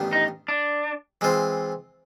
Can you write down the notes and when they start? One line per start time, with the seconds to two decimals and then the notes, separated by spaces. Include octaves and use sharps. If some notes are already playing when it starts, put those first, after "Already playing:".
Already playing: A1 G2 D#3 G3 B3
0.13 D#4
0.48 D4
1.21 E3 G#3 C4 F4